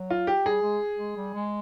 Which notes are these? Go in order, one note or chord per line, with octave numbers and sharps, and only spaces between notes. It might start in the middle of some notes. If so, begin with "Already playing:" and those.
Already playing: F#3
F4
G4
G3 G#4
G#3
G#3
G3
G#3